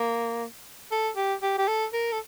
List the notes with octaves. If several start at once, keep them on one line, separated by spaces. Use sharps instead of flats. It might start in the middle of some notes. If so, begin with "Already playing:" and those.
Already playing: A#3
A4
G4
G4
G4
A4
A#4
A4